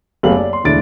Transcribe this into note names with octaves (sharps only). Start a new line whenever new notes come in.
F#1 A3 B3 G4 F5 F#7
D5
C6
E1 D2 D4 E4 A6 D7